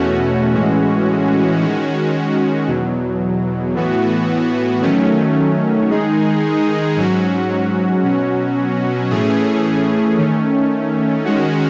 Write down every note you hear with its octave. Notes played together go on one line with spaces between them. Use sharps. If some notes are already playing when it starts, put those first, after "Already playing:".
Already playing: E2 B2 A3 C#4 F#4
A2 E3 G#3 C#4 F#4
D#3 G#3 C#4 F#4
E2 B2 F#3
A2 E3 B3 F#4
D#3 F#3 A3 C#4
D#3 G#3 D#4 G#4
G#2 F#3 C#4 F#4
B2 F#3 C#4 F#4
A2 E3 A3 C#4 G#4
D#3 A3 C#4
D#3 G#3 C#4 F#4